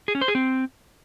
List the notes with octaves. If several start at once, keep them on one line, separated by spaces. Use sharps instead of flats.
G#4
C#4
C5
G#4
C4